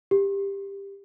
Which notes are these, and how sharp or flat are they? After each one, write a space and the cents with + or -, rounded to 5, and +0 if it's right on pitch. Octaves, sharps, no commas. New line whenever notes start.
G4 +15